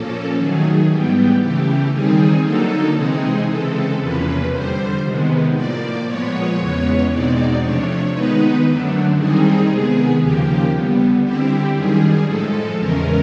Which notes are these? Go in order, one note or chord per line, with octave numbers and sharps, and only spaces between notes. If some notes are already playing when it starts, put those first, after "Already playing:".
Already playing: A#2 F3 A#3 C#4 A4
D#3 F#3 A3 G#4
G#2 E3 G3 B3 G4
C#3 E3 A3 G4
D#3 G3 C4 D#4 G#4
D3 F#3 A#3 D#4 A4
C3 E3 G#3 C4 D#4 G#4
C#3 E3 G#3 C4 A4
E2 C3 F3 A#3 C#4 B4
F2 D3 G3 C5
C3 D#3 G#3 B3
A2 F3 A#3 D5
A#2 F3 G#3 B3 C#5
E2 C#3 E3 G#3 B3
E2 B2 G#3 C4 D#4 D5
C3 F3 A3 D4 C#5
D#3 G#3 B3 D#4 B4
F#2 D3 F#3 A3 D4
D#3 G3 C4 D#4 G#4
C3 D#3 G#3 B3
D#2 C#3 F3 A#3 G4
D3 G3 B3
D3 G3 C4 E4 G4
F#2 D#3 G3 G#4
A2 F3 G#3 A4
E2 C#3 E3 G#3 C#4 A#4